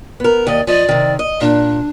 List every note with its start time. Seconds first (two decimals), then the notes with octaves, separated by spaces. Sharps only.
0.20 B3 A#4
0.47 D#2 D5 D#5
0.67 F3 D5 D#5
0.89 C3 D#3
1.19 D#5
1.41 A#2 D4